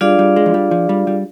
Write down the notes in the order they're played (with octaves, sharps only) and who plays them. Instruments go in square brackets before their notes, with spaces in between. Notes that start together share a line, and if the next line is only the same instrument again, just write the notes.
[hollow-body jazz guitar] G3 [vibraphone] D4 F4 G#4 D5 F5
[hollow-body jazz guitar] G3
G#3
F3
G3
F3
G3
G3